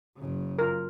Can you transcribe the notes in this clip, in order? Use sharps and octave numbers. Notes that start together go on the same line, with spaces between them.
F#1 C#3
F4 A#4